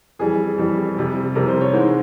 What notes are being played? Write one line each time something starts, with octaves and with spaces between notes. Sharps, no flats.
F2 E3 G3 G#4
F2 E3 G3
F2 C3 G3
F2 C3 G3 A#4
C5
C#5
G#2 E3 G#3 C5